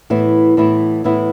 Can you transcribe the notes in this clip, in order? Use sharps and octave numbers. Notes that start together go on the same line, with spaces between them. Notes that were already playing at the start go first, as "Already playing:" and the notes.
A2 E3 B3 E4
A2 E3 B3 E4
A2 E3 B3 E4